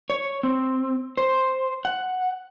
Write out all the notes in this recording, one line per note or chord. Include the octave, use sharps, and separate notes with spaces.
C#5
C4
C5
F#5